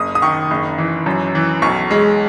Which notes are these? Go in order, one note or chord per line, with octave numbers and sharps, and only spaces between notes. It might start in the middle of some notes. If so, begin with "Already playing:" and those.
Already playing: F#1 D#6
D#6
D#3 C#6
F#1
E3
F#2
E3
B1 C#6
G#3